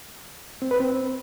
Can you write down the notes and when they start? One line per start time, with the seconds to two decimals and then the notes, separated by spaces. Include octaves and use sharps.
0.62 C4
0.71 B4
0.80 C4